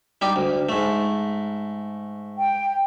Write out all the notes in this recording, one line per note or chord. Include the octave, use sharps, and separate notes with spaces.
G3 D#4 G4
D2
G#2 A3
G5